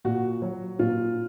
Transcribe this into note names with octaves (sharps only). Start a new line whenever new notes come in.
A#2 F#4
F#3
A#2 F4